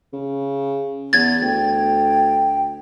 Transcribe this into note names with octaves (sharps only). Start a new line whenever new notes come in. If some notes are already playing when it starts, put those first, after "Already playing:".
C#3
E2 G#6 A6
D2 G5